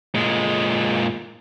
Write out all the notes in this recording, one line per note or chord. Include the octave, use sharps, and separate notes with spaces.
A#2 G#3